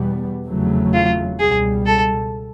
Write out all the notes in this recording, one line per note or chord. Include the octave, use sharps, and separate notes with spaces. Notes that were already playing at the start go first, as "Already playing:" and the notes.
Already playing: E2 B2 G3 B3
F1 E2 C#3 F#3 A3
F4
C#2 B2 G3 G#4
A4